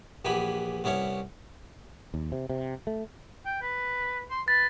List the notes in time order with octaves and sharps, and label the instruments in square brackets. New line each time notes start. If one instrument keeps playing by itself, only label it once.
[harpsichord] A#1 E3 B3 G4 G#5 B5
C2 B3 C#4 E4 C#5
[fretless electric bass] D#2
C3
C3
A3
[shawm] G5
B4
C6
[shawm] B4 [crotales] A6